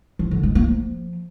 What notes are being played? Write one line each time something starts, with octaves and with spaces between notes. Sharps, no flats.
F3
D3
G#3
A#3
F3